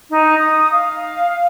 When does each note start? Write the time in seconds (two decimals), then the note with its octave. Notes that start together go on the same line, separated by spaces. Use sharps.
0.10 D#4
0.39 D#6
0.72 F5